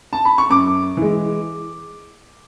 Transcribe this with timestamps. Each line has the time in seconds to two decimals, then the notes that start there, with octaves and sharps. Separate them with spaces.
0.13 A5
0.25 B5
0.38 C#6
0.50 F#2 D6
0.97 E3 G#3